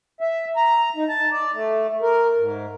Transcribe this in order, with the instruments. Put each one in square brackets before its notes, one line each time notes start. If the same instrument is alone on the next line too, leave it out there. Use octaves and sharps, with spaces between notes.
[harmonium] E5
A#5
D#4
A5
D5
A3
A#4
G#2